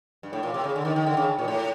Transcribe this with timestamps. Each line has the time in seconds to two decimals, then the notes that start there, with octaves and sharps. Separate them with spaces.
0.23 G2
0.33 A2
0.43 A#2
0.54 C3
0.64 C#3
0.76 D3
0.85 D#3
0.96 D#3
1.06 D3
1.17 C#3
1.38 A#2
1.48 A2